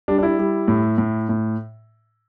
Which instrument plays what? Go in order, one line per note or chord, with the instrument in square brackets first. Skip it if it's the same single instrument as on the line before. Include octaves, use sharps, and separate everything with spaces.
[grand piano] G3 D4
D4
E4
G3
A2
A2
A2